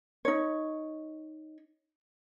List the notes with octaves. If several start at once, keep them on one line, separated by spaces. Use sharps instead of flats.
D#4 C#5